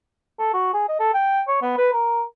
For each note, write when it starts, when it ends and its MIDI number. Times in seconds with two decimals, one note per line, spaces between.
0.39 0.52 69
0.54 0.73 66
0.74 0.86 68
0.88 0.98 75
1.00 1.11 69
1.14 1.42 79
1.48 1.62 73
1.62 1.77 59
1.78 1.90 71
1.93 2.23 70